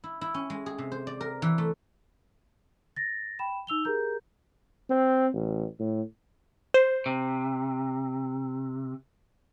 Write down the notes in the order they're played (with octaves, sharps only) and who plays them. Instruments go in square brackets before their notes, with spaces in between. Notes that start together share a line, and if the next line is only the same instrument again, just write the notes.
[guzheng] E4
E4
C#4
G#3
G#4
C3
C5
D5
A#4
E3
A3
[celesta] A6 A#6
G5 B5 E7
D#4 E6 F7 G7
G4 G#4 A#4 A#5 G6
[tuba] C4
A1
A2
[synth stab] C5
[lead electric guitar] C3